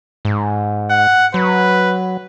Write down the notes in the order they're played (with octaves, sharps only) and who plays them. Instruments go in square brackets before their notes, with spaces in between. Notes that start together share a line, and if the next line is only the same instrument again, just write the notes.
[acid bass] G#2
[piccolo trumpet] F#5
[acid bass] F#3 [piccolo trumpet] B4